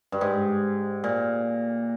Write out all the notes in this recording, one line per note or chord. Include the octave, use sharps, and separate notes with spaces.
G2
G#2
A#2